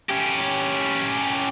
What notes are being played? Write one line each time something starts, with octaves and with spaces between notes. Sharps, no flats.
C#4 G4